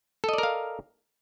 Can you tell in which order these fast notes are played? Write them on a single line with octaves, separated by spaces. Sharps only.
A4 D#5 D5 A#4 F5